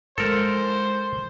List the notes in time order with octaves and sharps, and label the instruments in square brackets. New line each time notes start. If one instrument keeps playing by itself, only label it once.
[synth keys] F3 G#3 E4 [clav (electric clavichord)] A4 A#4 [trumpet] C5